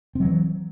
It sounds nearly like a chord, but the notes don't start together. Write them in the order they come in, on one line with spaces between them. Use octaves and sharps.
C4 F#3 E3